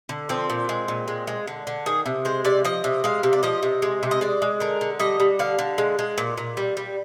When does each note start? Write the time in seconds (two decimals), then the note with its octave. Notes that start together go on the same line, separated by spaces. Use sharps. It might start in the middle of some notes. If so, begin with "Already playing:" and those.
0.09 D3
0.29 F3 C4
0.50 A#2
0.69 G#3
0.88 A#2
1.08 G#3
1.27 G#3
1.47 D3
1.67 D3
1.86 D#3 G#4
2.06 C3
2.25 G#3 C5
2.45 C3 D5
2.65 F3 D#5
2.84 C3
3.04 G#3 F5
3.23 C3
3.33 D5
3.43 F3 D#5
3.63 C3
3.82 G#3
4.03 C3
4.11 D#5
4.21 G#3 D5
4.42 G#3
4.60 D3 A#4
4.81 D3
5.00 G3 D#5
5.20 G3
5.39 D3 F5
5.59 D3
5.78 G#3
5.99 G#3
6.18 A#2
6.37 A#2
6.57 G3
6.77 G3